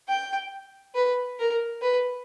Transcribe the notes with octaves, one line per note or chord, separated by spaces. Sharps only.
G5
B4
A#4
B4